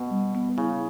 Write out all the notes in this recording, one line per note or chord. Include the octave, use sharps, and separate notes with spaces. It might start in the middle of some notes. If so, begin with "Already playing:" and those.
Already playing: B2 B3
G3
B3
C#3 E4